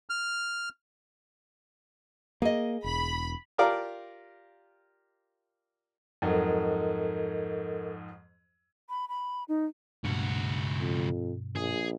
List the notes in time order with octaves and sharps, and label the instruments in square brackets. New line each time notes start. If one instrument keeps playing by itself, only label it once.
[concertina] F6
[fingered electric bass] A#3 [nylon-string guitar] G#4 D#5
[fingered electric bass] E1 [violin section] B5
[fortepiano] F4 G4 A#4 D5 F5
[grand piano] F2 G#2 F#3 [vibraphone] A4 A#4 D#5
[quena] B5
B5
D#4
[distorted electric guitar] C#2 F#4 [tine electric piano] G2 B2
[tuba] F2
[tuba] A#1 [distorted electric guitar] G#4